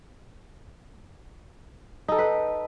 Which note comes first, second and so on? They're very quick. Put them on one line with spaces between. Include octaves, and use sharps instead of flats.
D#4 A4 G5 B4